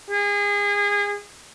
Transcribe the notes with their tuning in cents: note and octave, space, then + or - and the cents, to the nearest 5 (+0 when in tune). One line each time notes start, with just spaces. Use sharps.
G#4 -30